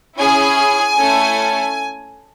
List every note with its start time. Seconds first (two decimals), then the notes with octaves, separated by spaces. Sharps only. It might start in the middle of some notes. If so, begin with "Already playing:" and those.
0.18 C#4 E4 G#4 G#5
0.97 A3 C#4 E4 A4